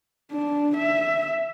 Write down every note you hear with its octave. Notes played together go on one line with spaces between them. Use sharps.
D4
E5